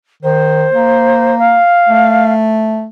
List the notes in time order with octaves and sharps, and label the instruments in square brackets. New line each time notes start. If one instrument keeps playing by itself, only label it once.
[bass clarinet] D#3 [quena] C5
[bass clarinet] A#3
[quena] F5
[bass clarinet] A3